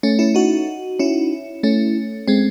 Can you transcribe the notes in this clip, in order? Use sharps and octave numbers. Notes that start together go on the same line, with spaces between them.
A3 C#4
C#4 E4
D#4 F#4
C#4 E4
A3 C#4
G#3 C4